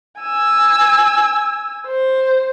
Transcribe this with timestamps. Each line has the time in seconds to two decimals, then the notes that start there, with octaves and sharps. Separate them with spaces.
0.20 G#5 E6
1.87 C5